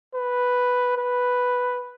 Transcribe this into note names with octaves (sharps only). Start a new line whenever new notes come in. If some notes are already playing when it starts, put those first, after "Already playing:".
B4
B4